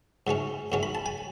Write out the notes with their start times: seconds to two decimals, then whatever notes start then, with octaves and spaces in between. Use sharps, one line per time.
0.27 G#2 F#3 A3 C#4
0.72 G#2 F#3 A3 C#4
0.83 B5
0.95 A5
1.06 G#5